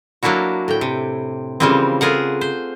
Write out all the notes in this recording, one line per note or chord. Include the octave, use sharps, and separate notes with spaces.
F#3 A#3 D4 E4 F#4
A2 G5
C3
C#3 E3 F3 G3 A#3 C4
A3 F4 G#4 A#4 F#5
C5